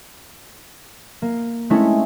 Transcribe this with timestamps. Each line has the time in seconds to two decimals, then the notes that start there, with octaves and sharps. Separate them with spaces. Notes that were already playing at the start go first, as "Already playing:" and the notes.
1.22 A#3
1.70 G#3 A3 C4 C#4 E4